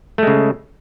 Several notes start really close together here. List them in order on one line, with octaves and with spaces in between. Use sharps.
A3 G#3 C#3